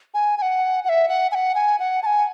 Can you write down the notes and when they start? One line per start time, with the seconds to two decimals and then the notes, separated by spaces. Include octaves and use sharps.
0.14 G#5
0.38 G#5
0.42 F#5
0.85 F#5
0.89 E5
1.09 F#5
1.32 G#5
1.35 F#5
1.55 G#5
1.79 F#5
2.03 A5
2.06 G#5